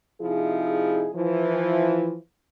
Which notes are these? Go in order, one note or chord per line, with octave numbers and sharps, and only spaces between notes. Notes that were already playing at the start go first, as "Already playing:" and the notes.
C3 F3 D#4 E4 G#4
E3 F3